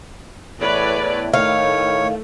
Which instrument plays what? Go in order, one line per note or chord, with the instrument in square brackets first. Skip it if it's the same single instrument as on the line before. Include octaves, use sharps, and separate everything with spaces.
[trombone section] E2 A2 [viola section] B4 C#5 D5
[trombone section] A2 D#3 [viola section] A3 [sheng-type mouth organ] C#5 [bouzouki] F5